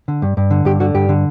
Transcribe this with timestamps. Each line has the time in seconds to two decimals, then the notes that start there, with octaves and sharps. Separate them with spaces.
0.08 D3
0.22 G2
0.37 G2
0.51 D3
0.65 G2 G4
0.80 D3 F#4
0.94 G2 G4
1.09 D3